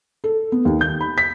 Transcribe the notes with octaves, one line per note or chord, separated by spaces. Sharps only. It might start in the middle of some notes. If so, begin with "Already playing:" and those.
A4
B3
D#2
G6
B5
B6